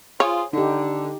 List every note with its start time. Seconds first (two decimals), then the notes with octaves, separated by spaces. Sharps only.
0.20 F4 G#4 C5 C#5
0.53 D3 D#4 G4